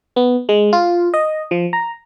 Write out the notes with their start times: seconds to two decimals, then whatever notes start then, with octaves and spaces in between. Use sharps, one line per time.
0.16 B3
0.49 G#3
0.73 F4
1.14 D#5
1.51 F3
1.73 A#5